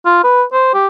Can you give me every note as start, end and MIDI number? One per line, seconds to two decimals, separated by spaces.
0.05 0.21 65
0.24 0.43 71
0.53 0.70 72
0.74 0.88 67